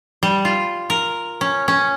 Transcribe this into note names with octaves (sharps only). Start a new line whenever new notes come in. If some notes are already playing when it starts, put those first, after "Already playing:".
G3
F4
A#4
C#4
C#4